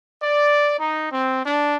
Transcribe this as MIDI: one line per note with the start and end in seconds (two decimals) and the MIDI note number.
0.20 0.75 74
0.79 1.08 63
1.11 1.40 60
1.45 1.75 62